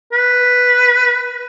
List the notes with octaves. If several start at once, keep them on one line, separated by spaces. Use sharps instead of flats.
B4